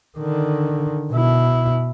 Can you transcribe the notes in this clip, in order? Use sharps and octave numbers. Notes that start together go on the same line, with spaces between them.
D3 D#3
B2 E4